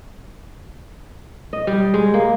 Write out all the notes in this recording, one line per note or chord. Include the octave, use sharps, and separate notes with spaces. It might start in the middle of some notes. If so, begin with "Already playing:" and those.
D#5
G3
G#3
A#3